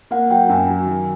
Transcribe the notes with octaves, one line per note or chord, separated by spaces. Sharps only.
A#3 F#5
F#3 G5
F#2 G#5
F#3
D#3